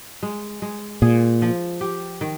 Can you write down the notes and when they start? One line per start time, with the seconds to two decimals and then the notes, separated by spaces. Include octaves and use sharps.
0.23 G#3
0.62 G#3
1.02 A#2 G#4
1.42 F3
1.81 G4
2.21 D#3